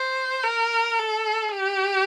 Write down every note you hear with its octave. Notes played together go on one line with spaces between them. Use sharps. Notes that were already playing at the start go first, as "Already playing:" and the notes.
Already playing: C5
A#4
A4
G4